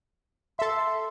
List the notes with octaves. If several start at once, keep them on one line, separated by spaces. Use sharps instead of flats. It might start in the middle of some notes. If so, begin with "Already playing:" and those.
A4 E5 C6